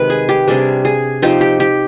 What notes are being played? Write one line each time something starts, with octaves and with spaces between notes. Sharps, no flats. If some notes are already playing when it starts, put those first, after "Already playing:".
Already playing: C3 D#3 G#3 B4
G#4
G4
C3 G3 D4 G#4
G#4
F3 C4 D#4 G4
G4
G4